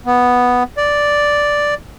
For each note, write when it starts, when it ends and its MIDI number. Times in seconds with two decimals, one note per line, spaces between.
0.06 0.63 59
0.77 1.74 74